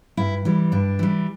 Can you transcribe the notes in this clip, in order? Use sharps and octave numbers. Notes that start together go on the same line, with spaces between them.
G2 E4
E3 G3
G2 D4
E3 G3